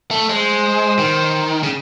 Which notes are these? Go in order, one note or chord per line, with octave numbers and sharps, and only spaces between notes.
A3
G#3 C5
D#3
C#3